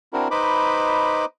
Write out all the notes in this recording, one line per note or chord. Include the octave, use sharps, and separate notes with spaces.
C4 D4 E4 F#4 A#4
D#4 B4 C5 D#5 B5 D6